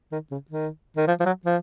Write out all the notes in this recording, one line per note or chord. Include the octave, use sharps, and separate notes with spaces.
D#3
C#3
D#3
D#3
F3
F3
F#3
F3